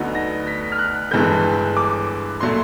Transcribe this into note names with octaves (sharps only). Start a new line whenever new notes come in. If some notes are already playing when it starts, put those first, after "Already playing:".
Already playing: D2 D3 F#3 B3 D#4
A#6
B6
F6
F#6
G1 G2 E3 G#3 B3 G6
D6
A#2 F#3 A3 C6